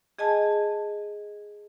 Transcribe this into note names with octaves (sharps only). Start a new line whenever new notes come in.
G#4 D#5 G#5 A5